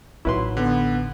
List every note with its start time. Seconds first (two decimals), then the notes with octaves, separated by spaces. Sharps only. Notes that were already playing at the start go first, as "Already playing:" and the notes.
0.25 A1 F#3 D#4 E4 B4 C6
0.57 D3 B3